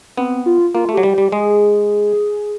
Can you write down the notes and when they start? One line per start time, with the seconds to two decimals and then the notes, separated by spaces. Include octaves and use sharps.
0.18 B3 C4
0.46 F4
0.75 A#3 F4
0.89 A3
0.94 F#3 G4
1.03 G3
1.13 G4
1.18 G3
1.32 G#3 G#4